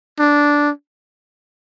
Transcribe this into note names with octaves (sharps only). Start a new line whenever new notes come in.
D4